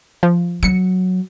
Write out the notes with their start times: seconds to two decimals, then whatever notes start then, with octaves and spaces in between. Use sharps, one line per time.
0.23 F3
0.63 F#3 C#7